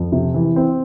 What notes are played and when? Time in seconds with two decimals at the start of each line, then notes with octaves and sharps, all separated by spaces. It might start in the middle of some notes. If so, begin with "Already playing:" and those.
Already playing: F2
0.12 C3
0.34 E3
0.56 C4